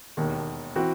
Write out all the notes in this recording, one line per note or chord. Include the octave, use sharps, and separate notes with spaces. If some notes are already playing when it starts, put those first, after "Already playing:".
E1 D#2 D#3
E3 C4 F#4